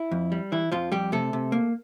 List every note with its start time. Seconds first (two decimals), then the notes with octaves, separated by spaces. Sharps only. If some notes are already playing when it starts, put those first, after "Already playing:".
Already playing: E4
0.12 F2
0.32 G3
0.52 E3 E4
0.72 F2 F3 F4
0.92 F2 G3 G4
1.12 C3 A3 A4
1.33 C3
1.52 A#3